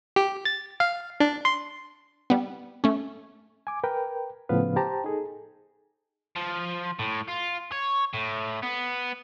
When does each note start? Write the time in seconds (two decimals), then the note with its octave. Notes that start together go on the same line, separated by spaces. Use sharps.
0.16 G4
0.45 A6
0.80 F5
1.20 D4
1.45 C6
2.30 G3 B3
2.84 A3 C#4
3.67 G#5 D6
3.84 A#4 B4 G5
4.49 A2 C#3 F3 B3 B4 F5
4.76 G4 C5 G5 A5 A#5
5.04 D#4 G#4 A4
6.36 F3
6.99 A2
7.29 F4
7.72 C#5
8.14 A2
8.63 B3